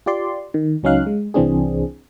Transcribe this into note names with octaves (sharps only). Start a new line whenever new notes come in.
F4 G4 D5 C6
D#3
C#2 F#3 C#4 D#4 F5 F#6
G#3
C2 E3 C4 D4 G#4